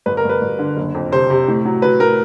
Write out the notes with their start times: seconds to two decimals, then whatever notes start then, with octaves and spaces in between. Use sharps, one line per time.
0.06 G1 B4
0.17 A#4
0.24 G1
0.29 B4
0.41 G1
0.59 D3
0.76 F#1
0.95 F2
1.12 C3 C5
1.30 C3
1.48 A2
1.65 F#3
1.82 F#3 B4
2.00 A2 A#4